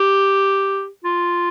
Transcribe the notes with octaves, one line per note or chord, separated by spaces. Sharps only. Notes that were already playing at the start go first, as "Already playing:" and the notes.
Already playing: G4
F4